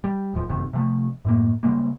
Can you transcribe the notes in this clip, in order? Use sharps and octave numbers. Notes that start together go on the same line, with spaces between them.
G3
D1 D#2 F3
F#1 F2 C3 D#3
C3 F3 A3
F#2 A2 A#3
C#3 G3 G#3 A#3